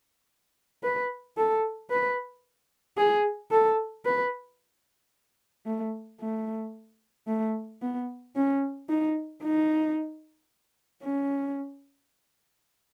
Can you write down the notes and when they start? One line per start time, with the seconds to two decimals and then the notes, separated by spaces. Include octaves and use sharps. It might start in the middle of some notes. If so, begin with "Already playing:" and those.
0.83 B4
1.37 A4
1.91 B4
2.97 G#4
3.51 A4
4.05 B4
5.66 A3
6.20 A3
7.27 A3
7.82 B3
8.35 C#4
8.89 D#4
9.42 D#4
11.03 C#4